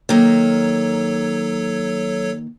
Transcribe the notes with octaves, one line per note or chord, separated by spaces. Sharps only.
D#3 F#3 A#3 A4 C#5